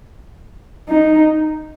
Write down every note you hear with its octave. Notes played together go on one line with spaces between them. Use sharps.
D#4